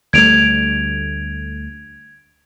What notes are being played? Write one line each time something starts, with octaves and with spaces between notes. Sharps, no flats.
D2 G3 A3 G#6 D7 F7